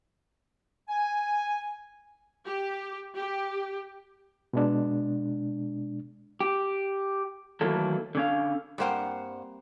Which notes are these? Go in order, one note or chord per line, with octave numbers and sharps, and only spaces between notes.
G#5
G4
G4
B2 G#3 D4
G4
D#3 E3 F#3 A3 A#3 A4
D3 C#4 F5
G2 G3 A#3 C4 C5 F#5